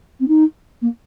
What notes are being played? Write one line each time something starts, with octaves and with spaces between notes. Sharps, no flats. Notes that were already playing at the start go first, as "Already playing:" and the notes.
C4
D#4
A#3